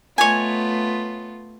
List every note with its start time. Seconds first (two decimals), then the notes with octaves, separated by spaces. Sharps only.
0.18 A3 B3 F4 C#5 D#5 G#5